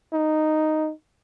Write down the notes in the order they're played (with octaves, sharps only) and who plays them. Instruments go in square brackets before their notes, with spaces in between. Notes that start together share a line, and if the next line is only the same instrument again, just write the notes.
[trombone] D#4